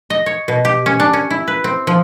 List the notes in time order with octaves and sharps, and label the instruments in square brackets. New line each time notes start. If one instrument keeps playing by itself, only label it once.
[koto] D#5
C#5
B2
G4
C#4
D4
C#4
E4
B4
C4
F3